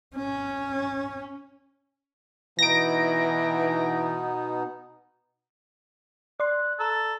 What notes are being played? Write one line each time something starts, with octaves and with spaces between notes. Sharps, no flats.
C#4
B2 E3 B3 D#4 A#6 D7
D5 C6 F#6
A4 A#5